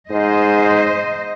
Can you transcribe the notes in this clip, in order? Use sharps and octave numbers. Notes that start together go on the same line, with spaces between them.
G#2 C5 D#5